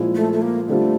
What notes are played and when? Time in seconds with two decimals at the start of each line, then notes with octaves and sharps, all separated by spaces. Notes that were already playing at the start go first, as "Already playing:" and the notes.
Already playing: A#2 F3 G#3 C4 E4
0.15 A3
0.33 A3
0.42 A#3
0.68 D3 G3 A3 C4 F4